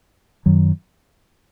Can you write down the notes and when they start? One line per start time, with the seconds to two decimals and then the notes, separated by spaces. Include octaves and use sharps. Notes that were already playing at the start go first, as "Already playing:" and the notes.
0.46 F#2 D#3 F#3